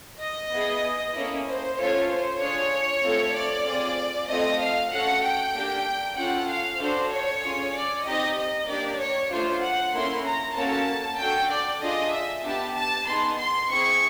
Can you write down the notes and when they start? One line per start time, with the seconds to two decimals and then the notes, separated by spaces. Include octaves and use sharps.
0.20 D#5
0.51 B3 E4 G#4
1.14 A#3 C#4 E4 A4
1.46 C5
1.78 A3 C#4 F4 A4 C#5
2.08 C5
2.39 D4 F4 G#4 C#5
3.03 A3 C4 F4 A4
3.34 D5
3.65 C4 F4 G#4
4.28 A3 C4 F4 A4 D#5
4.59 F5
4.91 A3 C#4 F#4 A4 F#5
5.22 G5
5.53 A#3 D4 G4
6.16 C#4 F4 A4 F#5
6.48 F5
6.79 D4 F#4 A4 C5
7.10 C#5
7.41 C#4 F4 G#4
7.74 D5
8.04 C4 D#4 G4 D#5
8.36 D#5
8.67 A#3 D4 G4 D5
8.99 C#5
9.30 A3 D4 F4 C5
9.61 F#5
9.93 A#3 C#4 E4 A4 C6
10.25 A#5
10.55 A#3 C#4 F#4 A4 A5
11.18 D4 F#4 A4 G5
11.50 D5
11.81 D4 F4 G#4 D#5
12.13 E5
12.43 B3 D4 G4 A5
12.75 A5
13.06 B3 D#4 G#4 C6
13.38 C6
13.69 C4 E4 G#4 C#6